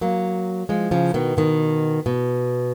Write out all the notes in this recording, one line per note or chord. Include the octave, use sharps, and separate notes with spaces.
F#3 A#3
F3 G#3
C#3 F3
B2 D#3
B2 D#3
B2